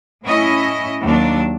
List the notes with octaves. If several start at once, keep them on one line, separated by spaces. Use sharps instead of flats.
A2 C#4 E4 D#5
D#2 F#3 D4